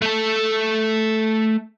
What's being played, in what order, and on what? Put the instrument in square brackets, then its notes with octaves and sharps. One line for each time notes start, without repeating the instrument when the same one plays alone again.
[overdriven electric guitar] A3 A4